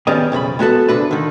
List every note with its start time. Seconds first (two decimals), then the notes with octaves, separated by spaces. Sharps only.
0.07 D#3 G3 B3 C#4 G#4 D#5
0.32 B1 F2 C#3 B5
0.59 G#3 B3 F#4 A4
0.88 C2 D3 B4
1.11 D3 D#3